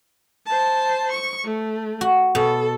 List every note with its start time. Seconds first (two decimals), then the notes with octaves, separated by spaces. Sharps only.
0.46 C5 A5
1.12 C#6
1.44 A3
2.01 F#4
2.35 B2 A4